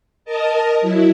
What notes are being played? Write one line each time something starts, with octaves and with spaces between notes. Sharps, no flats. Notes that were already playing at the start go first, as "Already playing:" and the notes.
A#4 D#5 A5
F#3 E4